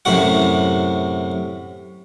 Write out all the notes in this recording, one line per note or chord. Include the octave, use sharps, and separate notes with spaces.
F#2 A2 C3 F#4 F#5